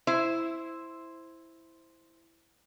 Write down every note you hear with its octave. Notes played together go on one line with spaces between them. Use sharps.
E4 C5